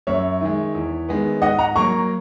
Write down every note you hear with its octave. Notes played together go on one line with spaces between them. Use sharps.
F#2 C#5 E5
D#3 G#3
E2
D#3 G#3 B3
G#2 D#5 F#5
F#5 A#5
F#3 A#3 A#5 C#6